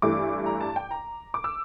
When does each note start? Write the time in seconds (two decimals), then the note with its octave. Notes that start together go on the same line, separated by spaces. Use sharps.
0.02 G2 E3 A3 E4 D6
0.46 A#5
0.61 A5
0.76 G5
0.91 A#5
1.34 D6
1.44 E6